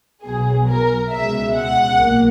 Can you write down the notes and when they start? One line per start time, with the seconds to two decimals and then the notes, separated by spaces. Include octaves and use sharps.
0.24 B1 B2 F#3 B3 G#4
0.68 A#4
1.11 C#2 B2 G#3 E5
1.54 F#5
1.97 B1 A#2 A#3